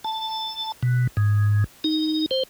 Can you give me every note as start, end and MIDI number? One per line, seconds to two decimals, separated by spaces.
0.04 0.72 81
0.83 1.07 47
1.17 1.64 44
1.84 2.26 63
2.31 2.43 72